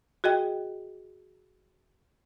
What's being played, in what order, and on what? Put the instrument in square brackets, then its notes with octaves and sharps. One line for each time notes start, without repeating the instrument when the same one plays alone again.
[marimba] F#4 G#4 D#5 G5